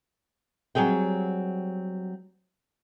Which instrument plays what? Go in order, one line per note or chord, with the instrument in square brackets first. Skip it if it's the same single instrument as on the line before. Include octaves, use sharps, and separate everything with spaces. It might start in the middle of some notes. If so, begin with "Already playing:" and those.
[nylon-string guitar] F#3 G3 C4 G#4 G5